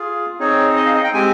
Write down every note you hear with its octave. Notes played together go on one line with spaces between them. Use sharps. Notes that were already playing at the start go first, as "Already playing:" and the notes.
Already playing: F4 G#4
C4 D#4 G#4 C#5
D#5
F5
D#5
G5
G#3 C4 G4 G#5